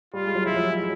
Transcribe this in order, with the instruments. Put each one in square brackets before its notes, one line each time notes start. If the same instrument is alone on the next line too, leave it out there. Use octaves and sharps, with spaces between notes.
[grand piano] G3 [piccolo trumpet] F4
[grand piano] G#3
F#3
[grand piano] F3 [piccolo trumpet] E4
[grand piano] F#3
G#3